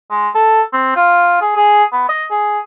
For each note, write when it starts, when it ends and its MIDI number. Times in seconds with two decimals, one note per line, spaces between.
0.11 0.29 56
0.35 0.62 69
0.73 0.94 60
0.96 1.37 65
1.41 1.55 68
1.56 1.84 68
1.92 2.09 59
2.09 2.25 75
2.31 2.59 68